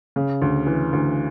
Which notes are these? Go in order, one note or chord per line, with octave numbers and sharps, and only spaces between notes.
C#3
D2
E3
D2